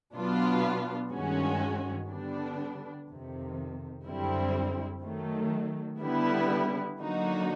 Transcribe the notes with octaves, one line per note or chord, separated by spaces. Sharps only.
B2 F#3 B3 D4 F4
G2 D#3 G#3 C#4 F#4
D3 G3 B3 D4
F2 C3 D#3
F#2 D3 G3 C4 E4
D#3 F#3 A3
D3 G3 B3 E4
D3 F#3 A#3 D#4 F#4